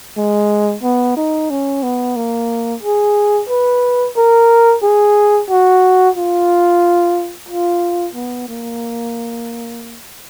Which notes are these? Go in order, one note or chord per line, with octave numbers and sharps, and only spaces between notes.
G#3
B3
D#4
C#4
B3
A#3
G#4
B4
A#4
G#4
F#4
F4
F4
B3
A#3